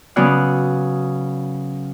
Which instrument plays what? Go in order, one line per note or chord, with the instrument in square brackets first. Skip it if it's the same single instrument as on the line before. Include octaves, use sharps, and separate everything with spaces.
[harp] C#3 F#3 B3 D5 F#6